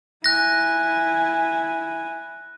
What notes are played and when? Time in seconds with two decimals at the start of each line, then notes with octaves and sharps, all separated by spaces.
0.24 E4 G#5 F#6 A#6